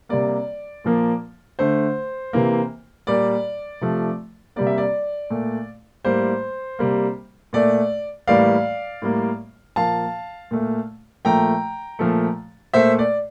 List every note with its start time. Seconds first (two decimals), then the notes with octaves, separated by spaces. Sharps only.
0.09 C3 G3 A#3 D5
0.84 A#2 F3 A#3
1.59 D3 A3 C5
2.33 C3 E3 A#3
3.07 A#2 G3 A#3 D5
3.81 C3 F3 A3
4.56 C3 G3 A#3 D5
4.67 E5
4.78 D5
5.30 A#2 A3
6.05 A2 G3 A#3 C5
6.79 C3 G3 A#3
7.53 A#2 A3 D5
8.27 A2 E3 G3 A#3 D5 F5
9.02 A2 G3 A#3
9.76 A#2 F3 A#3 F5 A5
10.51 A#2 A3
11.25 A#2 F3 A3 G5 A#5
11.99 A#2 F3 A3
12.74 A#2 A3 C5 E5
12.99 D5